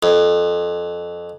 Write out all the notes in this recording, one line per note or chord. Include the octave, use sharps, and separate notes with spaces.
F2